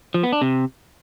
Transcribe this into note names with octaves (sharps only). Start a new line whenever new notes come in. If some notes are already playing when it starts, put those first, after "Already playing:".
F3
B3
D4
C3